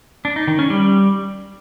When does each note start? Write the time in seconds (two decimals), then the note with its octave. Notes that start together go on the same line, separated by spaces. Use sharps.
0.25 D4
0.36 D#4
0.47 D#3
0.59 C#4
0.70 G3